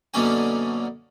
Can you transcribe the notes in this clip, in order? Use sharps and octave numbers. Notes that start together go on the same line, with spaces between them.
F#2 B2 D3 A#3 C#4 G#5